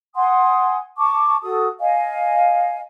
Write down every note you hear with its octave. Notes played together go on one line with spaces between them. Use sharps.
F#5 G#5 C6 D#6
A5 C#6 D6
F#4 A4 D#6
D#5 F5 G#5